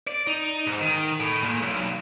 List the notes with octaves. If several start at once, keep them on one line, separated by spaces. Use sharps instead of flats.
D5
D#4
G#2
D#3
A2
A#2
B1